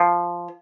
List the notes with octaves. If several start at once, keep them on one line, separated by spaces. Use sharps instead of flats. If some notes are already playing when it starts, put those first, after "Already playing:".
Already playing: F3